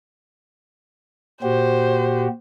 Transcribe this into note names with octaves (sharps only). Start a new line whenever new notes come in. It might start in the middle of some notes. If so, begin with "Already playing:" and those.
A#2 F#4 G4 C5